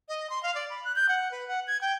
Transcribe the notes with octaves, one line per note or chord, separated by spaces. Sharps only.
D#5
C6
F5
D5
B5
F#6
G6
F#5
B4
F#5
G#6
G5